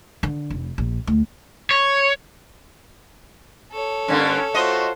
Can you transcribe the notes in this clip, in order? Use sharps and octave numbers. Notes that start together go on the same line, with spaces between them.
D3
F1
A#1
D2
C#5
A4 C#5
G2 D3 A#3 C#4
A3 F4 F#4 C5 D#5